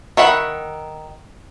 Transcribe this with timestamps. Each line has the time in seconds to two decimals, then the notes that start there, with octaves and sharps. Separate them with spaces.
0.17 D#3 E5 F#5 B5